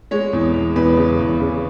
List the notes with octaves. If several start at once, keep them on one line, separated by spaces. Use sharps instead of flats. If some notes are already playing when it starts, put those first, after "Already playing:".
G#3 C#5
E2
E2
E2 B4
C#3
E2
C#3